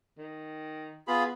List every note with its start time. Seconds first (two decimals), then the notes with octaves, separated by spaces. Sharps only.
0.18 D#3
1.08 B3 F4 G#4 B5